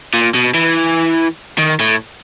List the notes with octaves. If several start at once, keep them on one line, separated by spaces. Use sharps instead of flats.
A#2
B2
E3
D#3
A2